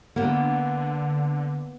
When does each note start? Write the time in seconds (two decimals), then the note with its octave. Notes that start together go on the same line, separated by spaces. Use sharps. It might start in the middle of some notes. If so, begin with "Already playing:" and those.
0.16 D3 A#3 B3